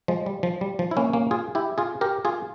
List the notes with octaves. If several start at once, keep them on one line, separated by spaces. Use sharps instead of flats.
F3 G#3
G3
F3
G3
F3
E4
A#3 C#4
A#3 C#4
F4 G#4
E4 G4
F4 G#4
G4 A#4
F4 G#4